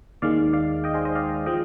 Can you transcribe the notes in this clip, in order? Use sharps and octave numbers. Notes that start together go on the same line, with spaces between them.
D#2 D#3 G#3 D5 F5
D5 F5
D#5 G5
G#4 C5
C5 D#5
D5 F5
F3 G#3 D#5 G5